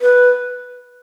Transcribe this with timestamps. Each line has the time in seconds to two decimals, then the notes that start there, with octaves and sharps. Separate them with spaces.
0.01 B4